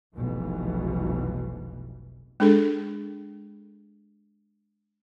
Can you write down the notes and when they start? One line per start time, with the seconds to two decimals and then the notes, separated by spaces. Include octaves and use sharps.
0.14 F1 B1 F2 G#2 B2 E3
2.40 G#3 D4 G#4 A4